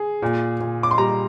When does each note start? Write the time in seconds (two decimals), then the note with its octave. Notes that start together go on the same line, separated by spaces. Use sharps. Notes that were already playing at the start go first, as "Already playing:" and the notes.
Already playing: G#4
0.22 A#2
0.60 A#2
0.83 D6
0.91 C6
0.98 G3 A#5